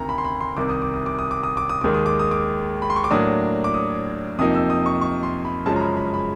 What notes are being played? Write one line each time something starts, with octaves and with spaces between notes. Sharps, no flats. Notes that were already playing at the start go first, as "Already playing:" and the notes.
Already playing: D2 C3 D#3 A#5
B5
C6
B5
C6
C2 C3 D#3 D6
D#6
D6
D#6
D6
D#6
D6
D#6
D6
D#6
D#2 D#3 G#3 D6
D#6
D6
D#6
D6
B5
C6
C#6
D6
A2 F#3 A#3 D4 D#6
D6
D#6
F2 C3 F3 A#3 D#4 D#6
E6
D#6
C#6
C#6
C6
B5
F#2 C#3 F3 G#3 C#4 A5
A#5
B5
B5
B5